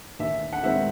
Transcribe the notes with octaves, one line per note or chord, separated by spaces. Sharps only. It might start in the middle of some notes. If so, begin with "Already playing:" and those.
D#2 E5
F#5
D#3 G#3 C4 E5